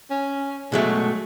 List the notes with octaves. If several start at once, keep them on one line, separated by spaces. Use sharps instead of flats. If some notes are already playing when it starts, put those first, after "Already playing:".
C#4
B2 F#3 G#3 A3